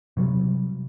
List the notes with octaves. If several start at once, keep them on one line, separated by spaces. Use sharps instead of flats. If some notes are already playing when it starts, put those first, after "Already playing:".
C3 F#3 G3